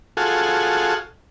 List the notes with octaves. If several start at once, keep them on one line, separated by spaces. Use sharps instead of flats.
F4 F#4 G#4 A4